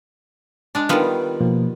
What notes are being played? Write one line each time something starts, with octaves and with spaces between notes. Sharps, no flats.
G#3 D4
D#3 G3 B3 F4
B2 F3 A#3